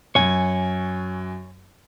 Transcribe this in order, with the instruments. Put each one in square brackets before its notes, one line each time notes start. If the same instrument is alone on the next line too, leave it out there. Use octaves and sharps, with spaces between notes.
[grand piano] F#2 [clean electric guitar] C#5 G#5